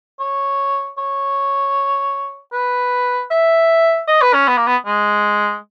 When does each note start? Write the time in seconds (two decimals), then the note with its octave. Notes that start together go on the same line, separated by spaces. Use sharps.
0.20 C#5
0.98 C#5
2.52 B4
3.31 E5
4.08 D#5
4.21 B4
4.34 C#4
4.47 B3
4.57 A#3
4.67 B3
4.86 G#3